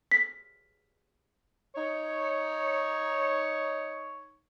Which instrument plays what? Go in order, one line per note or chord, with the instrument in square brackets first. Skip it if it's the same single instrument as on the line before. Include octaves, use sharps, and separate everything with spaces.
[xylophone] B6
[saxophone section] D#4 C#5